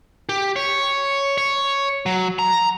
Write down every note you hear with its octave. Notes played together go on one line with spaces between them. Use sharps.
G4
C#5
C#5
F#3
A#5